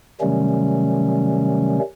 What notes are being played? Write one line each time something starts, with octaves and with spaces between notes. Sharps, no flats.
C3 D#3 F#3 G3 A3 C#4